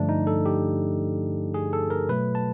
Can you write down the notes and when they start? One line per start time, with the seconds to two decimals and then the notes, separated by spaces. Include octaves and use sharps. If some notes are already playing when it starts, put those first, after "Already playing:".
Already playing: G2 D3 F3 A3 D4
0.09 D#4
0.27 A4
0.46 G4
1.54 G#4
1.73 A4
1.90 A#4
2.09 B2 F#3 A3 B4
2.35 A5